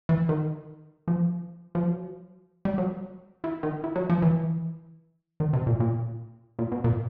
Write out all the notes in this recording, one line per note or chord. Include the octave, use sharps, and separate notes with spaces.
E3
D#3
F3
F3
F#3
G3
F#3
E3
D#3
E3
F#3
F3
E3
D#3
C3
A#2
A#2
A#2
B2
A#2